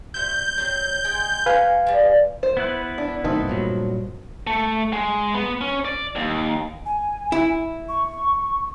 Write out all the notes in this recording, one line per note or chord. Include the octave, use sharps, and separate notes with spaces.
F#4 C5 E5 G6
F#3 B3 C4
G#3 G5 G#5
F#4 B4 F5 G#5
F3 G3
C5
B3 E4 B4
D4
B1 F#2 D#3 A3 C4 D#4
G2 A#2 F#3
A3
G#3
B3
C#4
D5
D#2
G#5
E4
C#6